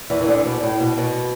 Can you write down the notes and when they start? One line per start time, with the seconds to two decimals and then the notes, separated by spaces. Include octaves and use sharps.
0.10 E2 E3
0.21 E3
0.27 D2 D3
0.46 B2
0.63 A2
0.80 B2
0.98 B2